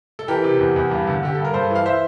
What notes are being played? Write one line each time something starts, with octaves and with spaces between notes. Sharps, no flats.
A4
E3 G4 A#4
C3
E2
E2
G2
D3
D3 G4
G2 A4
A#4
G2 A4 C5
E3
F5
E3 C5 E5